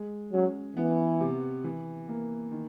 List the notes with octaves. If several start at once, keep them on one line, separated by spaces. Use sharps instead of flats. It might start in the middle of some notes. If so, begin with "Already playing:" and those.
Already playing: G#3
F#3 C#4
E3 B3
C3
E3
A#3
D#3